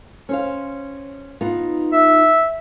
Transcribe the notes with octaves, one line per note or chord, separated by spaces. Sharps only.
C#4 C5 F5
B3 D#4 F4
E5